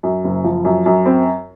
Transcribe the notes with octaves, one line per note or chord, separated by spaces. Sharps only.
F#2
F#1
F3
F#2
F#2
C4